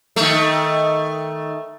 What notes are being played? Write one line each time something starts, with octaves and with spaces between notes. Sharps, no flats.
D#3 A3